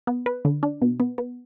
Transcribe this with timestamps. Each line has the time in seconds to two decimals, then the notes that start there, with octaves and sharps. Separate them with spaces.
0.07 B3
0.26 B4
0.45 D3
0.63 D4
0.82 B2
1.00 B3
1.18 B3